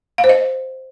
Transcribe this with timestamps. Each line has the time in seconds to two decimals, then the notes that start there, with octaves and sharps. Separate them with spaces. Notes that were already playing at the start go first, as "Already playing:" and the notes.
0.18 F5
0.24 C5
0.29 D#5